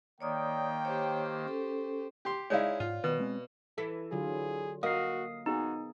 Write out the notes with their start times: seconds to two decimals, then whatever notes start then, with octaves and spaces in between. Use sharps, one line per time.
0.20 D#3 A#3 C#5 D5 G5 D#6
0.85 G4 C5 C#5
1.45 C#4 A4
2.25 G4 C6
2.50 G#3 D#4 E4 C#5 D5 F5
2.80 G#2 F4
3.04 B2 D#3 B4
3.20 G#3 C4
3.78 E3 E4 A4
4.12 D3 F#3 F4 G#4
4.83 A#3 F#4 A#4 D#5 F5 D#6 C7
5.46 B3 D#4 F#4 G#4